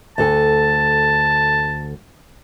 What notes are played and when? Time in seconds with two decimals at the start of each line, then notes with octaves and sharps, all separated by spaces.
0.18 D2 A4 G#5 A5